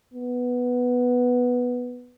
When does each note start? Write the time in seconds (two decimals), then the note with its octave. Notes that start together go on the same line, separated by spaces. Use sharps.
0.14 B3